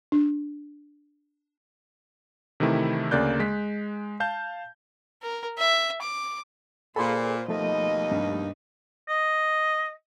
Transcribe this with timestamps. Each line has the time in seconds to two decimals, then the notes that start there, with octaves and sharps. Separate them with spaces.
0.12 D4
2.60 C3 D#3 E3 A3 E4
3.11 D2 C#3 A#3 D5 F#6 G6
3.40 G#3 B6
4.20 F5 A5 G6
5.23 A#4
5.58 E5
6.02 D6
6.96 A#2 F4 G#4 A4 C5 B5 C6
7.48 D#2 B2 F3 A3 D#4 D#5
8.11 G2
9.09 D#5